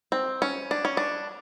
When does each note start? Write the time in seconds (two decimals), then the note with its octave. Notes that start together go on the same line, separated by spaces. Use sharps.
0.12 C4
0.42 C#4
0.71 D4
0.85 C#4
0.97 D4